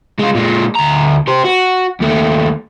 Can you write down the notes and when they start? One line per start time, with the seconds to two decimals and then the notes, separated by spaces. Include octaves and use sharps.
0.19 G#3 F4
0.35 A#2 G#3
0.75 D2 A#5
1.28 G4 C5
1.45 F#4
2.00 D#2 A3